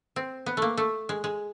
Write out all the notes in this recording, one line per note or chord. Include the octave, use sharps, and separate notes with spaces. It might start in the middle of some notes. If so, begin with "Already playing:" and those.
C4
B3
A3 A#3
A3
G#3
G#3